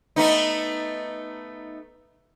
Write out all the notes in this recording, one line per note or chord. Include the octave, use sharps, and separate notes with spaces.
A3 B3 D#4